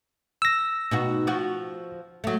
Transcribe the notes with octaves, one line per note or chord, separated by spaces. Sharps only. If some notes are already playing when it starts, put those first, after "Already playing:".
E6 A#6
B2 D#4 F#4
F3 F#4
F#3 A3